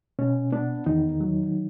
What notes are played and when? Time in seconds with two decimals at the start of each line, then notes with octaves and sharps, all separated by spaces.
0.19 B2 C#4
0.52 B3 D4
0.86 E2 D#3 D#4
1.21 F#3